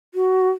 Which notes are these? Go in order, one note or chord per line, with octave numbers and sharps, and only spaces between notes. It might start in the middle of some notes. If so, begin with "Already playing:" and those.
F#4